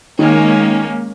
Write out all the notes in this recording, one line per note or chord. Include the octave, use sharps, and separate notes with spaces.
D#3 G#3 A#3 C#4